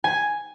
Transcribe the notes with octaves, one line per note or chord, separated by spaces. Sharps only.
G#5